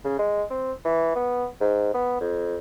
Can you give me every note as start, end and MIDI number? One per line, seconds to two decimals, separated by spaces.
0.04 0.18 49
0.19 0.43 56
0.51 0.72 60
0.85 1.11 52
1.16 1.45 59
1.61 1.91 44
1.94 2.16 59
2.21 2.59 41